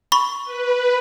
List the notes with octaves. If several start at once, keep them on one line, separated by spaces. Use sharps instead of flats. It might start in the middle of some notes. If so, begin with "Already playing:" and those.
B5 C#6
B4